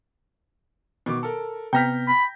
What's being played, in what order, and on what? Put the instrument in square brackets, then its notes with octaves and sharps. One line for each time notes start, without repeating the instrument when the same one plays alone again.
[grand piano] B2 D#3 D6
A4 A#4
[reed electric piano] C3 B3 F6 [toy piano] G5 A#5 [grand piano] G6 A#6 B6
[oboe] B5